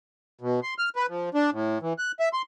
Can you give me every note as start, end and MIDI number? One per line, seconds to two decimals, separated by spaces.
0.41 0.60 47
0.63 0.74 84
0.79 0.89 89
0.96 1.06 71
1.09 1.29 53
1.34 1.50 62
1.52 1.78 45
1.82 1.93 52
1.98 2.12 90
2.20 2.29 76
2.33 2.42 84